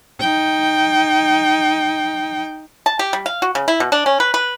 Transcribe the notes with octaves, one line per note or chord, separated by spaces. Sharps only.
D#4 G5
A5
G4
G3
F5
F#4
C#3
E4
B2
D4
C#4
B4
B4